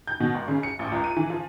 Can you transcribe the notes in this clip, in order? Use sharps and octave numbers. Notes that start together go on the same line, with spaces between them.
G6
B2
G#1
C#3
C#7
A1
C#2
D#7
E3
F3